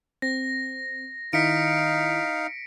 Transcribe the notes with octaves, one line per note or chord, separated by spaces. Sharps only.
C4 A#6
D#3 D#4 E4 F5 B6 C#7 D7